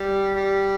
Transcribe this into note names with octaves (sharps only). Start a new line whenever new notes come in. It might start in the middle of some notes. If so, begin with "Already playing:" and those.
Already playing: G3
G3